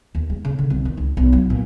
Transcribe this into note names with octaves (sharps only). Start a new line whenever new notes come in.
D#2
G#3
C#3
D3
C2
D#3
C#2
B1
F#3
A#2